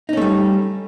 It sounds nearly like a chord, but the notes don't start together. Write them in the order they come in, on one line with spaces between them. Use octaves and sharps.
D#4 C#4 A3 G3